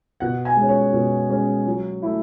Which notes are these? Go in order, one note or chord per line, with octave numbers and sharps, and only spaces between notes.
B2 F#5
G#5
G#3 C#4
C#5
B2
G#3 C#4
F#3
A3 E4